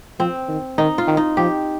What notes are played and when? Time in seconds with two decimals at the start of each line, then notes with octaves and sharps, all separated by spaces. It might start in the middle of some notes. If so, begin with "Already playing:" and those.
0.19 F3 C4
0.48 D#3
0.78 D#3 D#4
0.98 F4
1.07 D#3
1.17 D#4
1.37 F3 G4